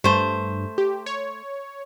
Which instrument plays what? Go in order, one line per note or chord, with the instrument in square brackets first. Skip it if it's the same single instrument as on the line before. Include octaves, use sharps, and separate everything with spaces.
[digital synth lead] G2 [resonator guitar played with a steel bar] A3 C5
[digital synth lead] G4
C#5